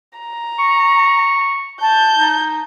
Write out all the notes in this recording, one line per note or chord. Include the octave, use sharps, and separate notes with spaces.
A#5
C#6
A5 G6
D#4